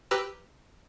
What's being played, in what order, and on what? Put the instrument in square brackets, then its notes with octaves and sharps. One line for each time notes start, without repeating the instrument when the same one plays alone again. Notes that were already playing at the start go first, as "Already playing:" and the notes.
[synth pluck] G4 B4 A#5 E6 F6